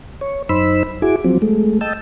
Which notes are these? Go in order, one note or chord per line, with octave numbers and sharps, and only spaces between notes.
C#5
F#2 D#4 C5 B5 E6
E4 F#4 G#4 G#5 D6
F3 F#3 C4
G#3 A3
D#5 G5 A5 E6